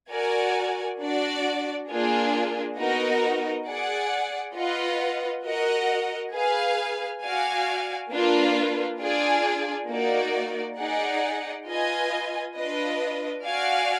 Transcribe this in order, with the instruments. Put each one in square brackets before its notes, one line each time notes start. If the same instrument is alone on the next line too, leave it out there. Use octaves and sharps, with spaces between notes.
[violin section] F#4 A#4 D5 G#5
D4 F#4 D5
A#3 D4 F4 G#4
B3 D#4 F#4 A#4 D#5
G#4 D5 F#5
F4 B4 D#5 F#5
F#4 A#4 D#5 F#5
G#4 B4 F5
F#4 D5 F5 G#5
A#3 D4 F4 B4
D4 F4 G#4 D5
A#3 D#4 F#4 D5
D#4 G#4 D5 F#5
F4 B4 D#5 G#5
D4 F4 B4 D#5
F#4 D5 F5 G#5